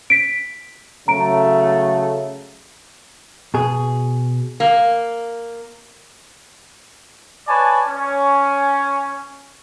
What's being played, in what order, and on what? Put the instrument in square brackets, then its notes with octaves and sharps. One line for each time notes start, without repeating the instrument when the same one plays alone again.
[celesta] B6 D7
[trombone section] C#3 F#3 A3 [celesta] A#5 D7
[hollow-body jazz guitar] B2 G#4
[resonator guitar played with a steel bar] A#3
[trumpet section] B4 C#5 D5 G#5 A5
C#4